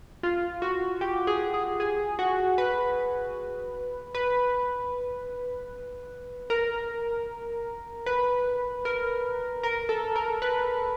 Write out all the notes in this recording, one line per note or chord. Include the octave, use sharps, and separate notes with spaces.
F4
F#4
G4
G#4
G#4
G#4
F#4
B4
B4
A#4
B4
A#4
A#4
A4
A#4
B4